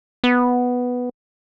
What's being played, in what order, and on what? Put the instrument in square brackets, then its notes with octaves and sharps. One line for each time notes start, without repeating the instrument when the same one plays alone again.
[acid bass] B3